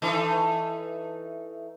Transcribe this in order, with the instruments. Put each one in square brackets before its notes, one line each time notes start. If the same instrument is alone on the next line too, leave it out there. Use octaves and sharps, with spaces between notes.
[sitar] E3 A3 D#4